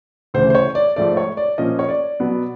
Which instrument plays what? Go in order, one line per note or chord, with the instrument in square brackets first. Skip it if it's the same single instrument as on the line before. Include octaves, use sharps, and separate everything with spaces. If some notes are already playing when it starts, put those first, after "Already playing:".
[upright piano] D2 C#3 E3 C5
C5
C#5
D5
G#2 F3 A3 D5
C#5
D5
A#2 F3 A#3 C#4 D#5
C#5
D5
B2 F#3 B3